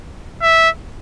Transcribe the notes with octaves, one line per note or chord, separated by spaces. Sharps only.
E5